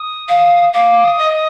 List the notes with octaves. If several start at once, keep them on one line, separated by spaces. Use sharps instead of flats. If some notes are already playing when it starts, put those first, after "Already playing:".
Already playing: D#6
F5
F5 D6
D#6
D#5
D#6